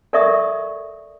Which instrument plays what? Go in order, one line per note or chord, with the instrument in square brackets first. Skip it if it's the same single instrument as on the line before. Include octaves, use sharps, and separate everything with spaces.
[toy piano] A4 A#4 D5 E5 C#6 D#6